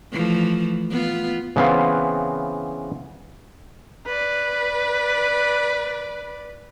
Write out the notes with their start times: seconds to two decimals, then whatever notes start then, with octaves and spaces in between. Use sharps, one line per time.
0.12 E3 F3 A3
0.90 B3 F4
1.56 C#3 E3 B3 C4 F5
4.06 B4 D5